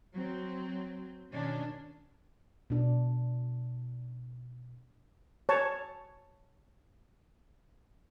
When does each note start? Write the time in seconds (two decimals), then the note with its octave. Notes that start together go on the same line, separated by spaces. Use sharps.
0.14 F#3 C4
1.33 B2 D#3 C#4 D4
2.70 B2 D4
5.49 C#5 A5